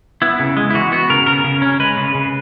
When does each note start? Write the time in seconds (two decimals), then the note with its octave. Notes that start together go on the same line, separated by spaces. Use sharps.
0.22 B3 E4
0.40 C#3
0.57 G#3
0.70 E4
0.74 E3 F#4
0.92 B3 F#4
1.10 C#3 A#4
1.27 C#3 A#4
1.44 C#3
1.62 C#4
1.80 G#3 B4
1.97 C#3
2.15 C#3